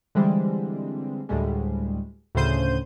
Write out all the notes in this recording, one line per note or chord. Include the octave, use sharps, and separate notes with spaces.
D3 E3 G3 G#3 C4
D2 A2 G3 G#3
D2 A2 C#3 C5 G6 D#7